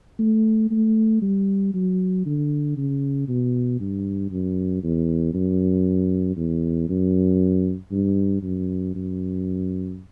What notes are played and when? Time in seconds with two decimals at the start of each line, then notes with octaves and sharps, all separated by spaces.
0.19 A3
0.71 A3
1.22 G3
1.74 F#3
2.26 D3
2.77 C#3
3.28 B2
3.80 G2
4.31 F#2
4.83 E2
5.34 F#2
6.37 E2
6.89 F#2
7.92 G2
8.43 F#2
8.95 F#2